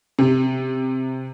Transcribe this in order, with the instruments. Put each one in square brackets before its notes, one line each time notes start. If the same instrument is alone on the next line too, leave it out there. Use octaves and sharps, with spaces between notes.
[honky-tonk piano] C3